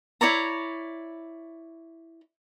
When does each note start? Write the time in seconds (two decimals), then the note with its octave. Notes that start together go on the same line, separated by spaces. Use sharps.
0.21 E4 C#5 D5 A#5